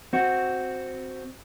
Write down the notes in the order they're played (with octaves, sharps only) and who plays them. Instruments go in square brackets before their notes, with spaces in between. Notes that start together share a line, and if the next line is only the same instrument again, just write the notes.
[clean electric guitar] C4 F#4